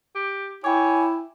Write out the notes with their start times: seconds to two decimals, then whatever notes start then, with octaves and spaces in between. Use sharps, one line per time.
0.15 G4
0.64 E4 C#5 G5 G#5 D6